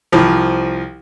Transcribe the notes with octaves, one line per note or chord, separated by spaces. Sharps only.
C2 F3